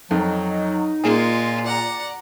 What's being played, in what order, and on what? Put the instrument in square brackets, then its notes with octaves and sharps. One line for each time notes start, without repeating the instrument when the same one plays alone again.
[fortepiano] F2 [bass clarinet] F#3 [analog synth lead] D#4
[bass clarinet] A#2 [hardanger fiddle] G#3 F4 [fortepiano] A#3 G#4
[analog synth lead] D5 [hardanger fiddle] F#5 A#5